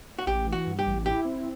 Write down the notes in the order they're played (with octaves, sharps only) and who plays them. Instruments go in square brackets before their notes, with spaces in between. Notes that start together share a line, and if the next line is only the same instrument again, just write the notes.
[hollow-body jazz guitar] F#4
[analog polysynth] A1 [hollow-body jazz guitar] G4
[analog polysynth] E3
[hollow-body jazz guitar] F#4
[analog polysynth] G2
[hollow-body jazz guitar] G4
[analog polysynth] A1
[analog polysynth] E4 [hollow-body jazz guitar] G4
[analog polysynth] C4